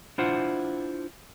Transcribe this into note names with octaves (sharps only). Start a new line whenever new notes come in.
D4 E4 F4 C5 F#5